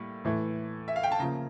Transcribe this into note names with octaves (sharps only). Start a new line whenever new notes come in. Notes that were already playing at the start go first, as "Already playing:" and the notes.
Already playing: A2 G3 A#3
A2 E3 A3
E5
F5
G5
A5
C#3 F3 A#3 A#5